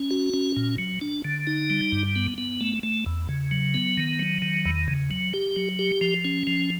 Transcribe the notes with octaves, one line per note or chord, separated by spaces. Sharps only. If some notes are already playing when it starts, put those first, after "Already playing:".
Already playing: C#4
F#4
C#4
A#2
F#3
D4
D3
D#4
G3
G2
B3
B3
A3
A3
E2
C#3
F#3
B3
D#3
F#3
D#3
E2
C#3
F#3
G4
F#3
G4
F3
C#4
F3